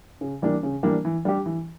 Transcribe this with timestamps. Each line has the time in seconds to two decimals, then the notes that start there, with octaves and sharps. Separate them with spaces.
0.21 C#3
0.42 E3 G3 A#3 D4
0.63 C#3
0.83 E3 G3 A#3 D4
1.05 E3
1.25 G3 D4 G4
1.46 E3